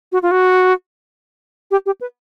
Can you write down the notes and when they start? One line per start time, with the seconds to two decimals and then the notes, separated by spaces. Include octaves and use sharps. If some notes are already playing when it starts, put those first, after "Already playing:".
0.12 F#4
0.23 F4
0.31 F#4
1.71 G4
1.86 G4
2.01 B4